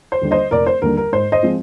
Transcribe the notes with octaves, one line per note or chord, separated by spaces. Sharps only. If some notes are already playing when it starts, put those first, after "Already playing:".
C5
D#2 D3 G3
C5 D#5
F1 A#4 D5
C5
D#2 D3 G3 A#4
A#4
G#2 C5
C5 D#5
F3 G#3 C4